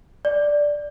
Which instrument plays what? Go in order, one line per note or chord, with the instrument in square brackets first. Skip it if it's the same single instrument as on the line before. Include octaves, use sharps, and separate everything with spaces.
[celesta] D5